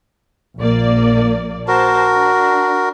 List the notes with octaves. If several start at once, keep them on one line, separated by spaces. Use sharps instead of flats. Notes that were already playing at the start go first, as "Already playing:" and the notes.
A#1 A#3 D5
F#4 A#4 C5 A5
D4